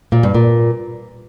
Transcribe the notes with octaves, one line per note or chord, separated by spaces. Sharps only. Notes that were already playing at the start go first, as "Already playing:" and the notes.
A#2
G2
A#2